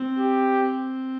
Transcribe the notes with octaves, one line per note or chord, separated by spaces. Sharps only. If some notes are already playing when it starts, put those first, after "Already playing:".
Already playing: C4
G4
C4